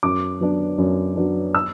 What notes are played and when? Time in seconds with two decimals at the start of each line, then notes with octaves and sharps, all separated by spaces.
0.03 F#2 D6
0.41 F#3 B3 D4
0.78 F#2
1.16 F#3 B3 D4
1.55 E6